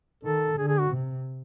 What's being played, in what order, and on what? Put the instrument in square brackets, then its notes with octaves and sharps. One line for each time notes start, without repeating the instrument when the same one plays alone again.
[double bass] D#3 [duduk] A4
[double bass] D3 [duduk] G#4
[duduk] G#4
F#4
[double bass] C3